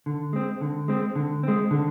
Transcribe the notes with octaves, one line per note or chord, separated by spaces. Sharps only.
D3
G#3 C4
D3
G#3 C4
D3
G#3 C4
D3